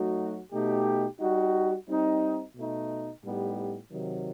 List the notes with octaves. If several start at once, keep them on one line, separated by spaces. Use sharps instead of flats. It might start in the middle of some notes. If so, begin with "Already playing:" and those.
Already playing: F#3 A3 D#4 F#4
B2 A3 D#4 G4
G3 D#4 F#4
G3 C4 D#4
B2 A3 D#4
A2 G3 B3 D#4 G4
C3 D#3 F#3